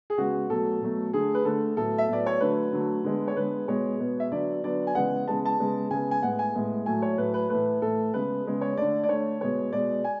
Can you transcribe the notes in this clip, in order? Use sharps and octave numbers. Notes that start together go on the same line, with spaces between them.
G#4
C#3 G#3 B3 F#4
B2 F#3 A3 A4
B2 F#3 A3
D3 A3 G#4
B4
D3 A3 A4
A2 F#3 B3 A4
E5
A2 F#3 B3 D5
C#5
D3 F#3 A3 B4
D3 F#3 A3
D3 G#3 B3
C#5
D3 G#3 B3 B4
B2 G#3 B3 C#5
B2 G#3 B3
E5
D3 F#3 B3 D5
D3 F#3 B3 D5
G#5
C#3 E3 G#3 B3 F#5
C#3 E3 G#3 B3 A5
A5
C#3 G#3 B3
C#3 G#3 B3 G#5
G#5
A2 G#3 B3 F#5
G#5
A2 G#3 B3
A2 F#3 A3 G#5
C#5
A2 F#3 A3 B4
B4
A2 E3 A3 B4
A2 E3 A3 A4
C#3 G#3 B3 B4
C#3 G#3 B3
C#5
D3 A3 D5
D5
D3 A3 C#5
B2 G#3 B3 C#5
B2 G#3 B3 D5
G#5